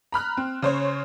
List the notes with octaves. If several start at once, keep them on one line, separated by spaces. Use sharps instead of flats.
A#5 B5 F6 F#6
C4
C#3 C5 C#5